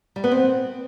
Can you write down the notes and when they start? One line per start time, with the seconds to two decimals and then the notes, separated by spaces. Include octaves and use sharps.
0.16 G3
0.24 B3
0.31 C4